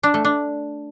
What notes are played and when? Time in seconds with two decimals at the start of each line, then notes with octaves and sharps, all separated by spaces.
0.03 D4
0.14 A3
0.25 D4